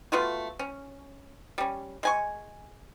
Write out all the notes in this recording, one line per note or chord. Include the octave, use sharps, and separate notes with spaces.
A3 B3 F4 F#4
C#4
G3 C#4
G#3 G#5 C#6